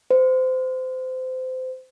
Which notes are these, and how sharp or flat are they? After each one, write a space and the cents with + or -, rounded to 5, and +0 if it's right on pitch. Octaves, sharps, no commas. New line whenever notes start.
C5 -25